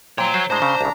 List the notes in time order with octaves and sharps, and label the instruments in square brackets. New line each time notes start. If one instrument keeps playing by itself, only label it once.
[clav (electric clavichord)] A#2 [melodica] C5 G5 [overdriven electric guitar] C#5 A#5
[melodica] F#4 G#5 [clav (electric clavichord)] C5
[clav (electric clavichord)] A2 G#3 [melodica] D4 A#5 [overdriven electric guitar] C5
[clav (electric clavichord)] C#3
C2 C#3